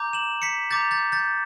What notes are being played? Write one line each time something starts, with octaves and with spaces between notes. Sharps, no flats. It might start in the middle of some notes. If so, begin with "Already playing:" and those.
Already playing: A#5 D6 G6
E7 F#7
B6 C#7
A#5 D6 G6 A6
G6 A6
G6 A6